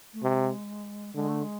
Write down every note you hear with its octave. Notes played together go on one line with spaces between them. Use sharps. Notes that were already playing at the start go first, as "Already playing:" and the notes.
A3
C3 G#3
D3 G#3
A3
G#3